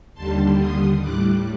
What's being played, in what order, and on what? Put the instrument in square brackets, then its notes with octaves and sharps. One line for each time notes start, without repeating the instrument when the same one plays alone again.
[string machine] D#2 D3 G3 A5 C6
C6 D#6
A2 G3 D6 F#6